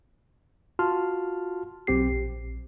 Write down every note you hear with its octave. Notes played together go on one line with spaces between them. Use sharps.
F4 F#4 A5 C6 F6
B1 C4 G4 C7
A#1